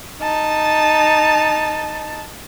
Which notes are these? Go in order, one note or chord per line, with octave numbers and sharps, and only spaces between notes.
D#4 A5